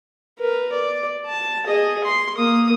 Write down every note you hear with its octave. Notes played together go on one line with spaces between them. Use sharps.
A#4 B4
D5
A5
G#4 D#5
C6
A#3 D#6